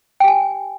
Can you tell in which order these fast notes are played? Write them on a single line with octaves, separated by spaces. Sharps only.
G5 G4 G#5